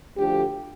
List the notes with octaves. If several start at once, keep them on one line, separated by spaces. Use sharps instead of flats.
D2 D3 F3 G4